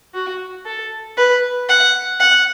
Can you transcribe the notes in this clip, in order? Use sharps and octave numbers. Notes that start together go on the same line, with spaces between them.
F#4
A4
B4
F#5
F#5